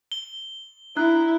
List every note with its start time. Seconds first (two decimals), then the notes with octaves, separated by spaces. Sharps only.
0.12 G7
0.97 D4 E4 A#5 F#6